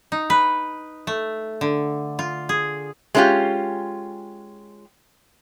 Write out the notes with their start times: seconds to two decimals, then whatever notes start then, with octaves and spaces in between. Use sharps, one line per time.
0.12 D#4
0.30 B4
1.07 A3
1.61 D3
2.19 F4
2.49 G#4
3.15 G#3 A3 C#4 E4 F4 G4